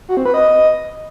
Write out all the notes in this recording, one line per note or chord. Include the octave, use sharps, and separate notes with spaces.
F#4
C4
B4
D#5